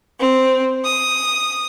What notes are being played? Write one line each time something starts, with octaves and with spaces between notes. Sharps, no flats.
C4
D#6